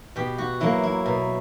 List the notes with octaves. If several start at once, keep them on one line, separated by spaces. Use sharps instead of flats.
B2 G4
F#4
F#3 A#3 E4
E4
B2